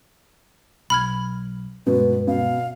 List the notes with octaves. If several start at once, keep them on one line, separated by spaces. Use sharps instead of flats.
B1 B5 F6 G#6
D1 G2 B2 G#3 B4
B2 F5